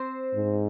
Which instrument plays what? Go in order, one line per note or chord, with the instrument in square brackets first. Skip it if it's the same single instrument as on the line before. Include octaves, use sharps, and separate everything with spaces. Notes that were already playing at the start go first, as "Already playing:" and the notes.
Already playing: [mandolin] C4 C5
[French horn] G#2